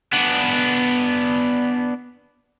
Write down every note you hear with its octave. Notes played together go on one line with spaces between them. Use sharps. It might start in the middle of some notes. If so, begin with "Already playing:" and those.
B3 D4